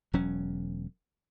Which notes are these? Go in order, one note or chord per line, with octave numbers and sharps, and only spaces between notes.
E1 F#3 C#4